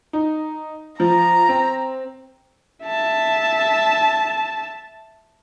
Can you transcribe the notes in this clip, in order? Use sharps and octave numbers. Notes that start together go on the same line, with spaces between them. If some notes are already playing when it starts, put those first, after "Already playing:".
D#4
F3 A#5
C4
E5 A5